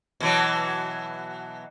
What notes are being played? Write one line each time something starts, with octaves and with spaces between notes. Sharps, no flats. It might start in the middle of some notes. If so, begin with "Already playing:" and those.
B2 E3 F#3